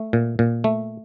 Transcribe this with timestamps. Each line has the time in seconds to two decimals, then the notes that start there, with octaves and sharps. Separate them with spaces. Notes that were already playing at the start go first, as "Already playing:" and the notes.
Already playing: A3
0.13 A#2
0.39 A#2
0.64 A3